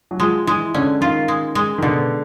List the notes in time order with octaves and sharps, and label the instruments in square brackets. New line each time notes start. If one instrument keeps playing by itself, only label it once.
[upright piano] F#3
[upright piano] F3 [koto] G#3
[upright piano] E3 [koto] G#3
[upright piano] D3 [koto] C#4
[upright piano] D#3 [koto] F4
[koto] G#3
G#3
[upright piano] D#3
[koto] B2 [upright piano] D3